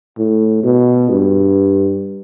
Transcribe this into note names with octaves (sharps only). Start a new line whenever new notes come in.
A2
B2
G2